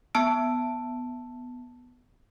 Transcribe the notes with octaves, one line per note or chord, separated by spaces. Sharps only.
B3 A5 E6 D7